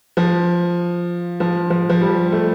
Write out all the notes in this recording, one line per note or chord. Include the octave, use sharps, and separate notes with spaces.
F3
F3
F3
F3
G3
A3